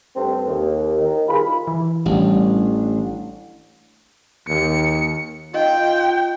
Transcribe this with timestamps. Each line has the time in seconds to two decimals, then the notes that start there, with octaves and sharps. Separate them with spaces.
0.16 G2 A3 C4
0.46 D#2
0.99 D#3
1.28 C2 F4 G#4 B5
1.67 E3
2.06 A1 G3 D4
4.48 D#2 C#7
5.54 D#4 F4 A#4 D#5 G5